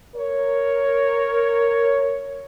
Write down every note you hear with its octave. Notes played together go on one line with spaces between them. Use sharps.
A#4 C#5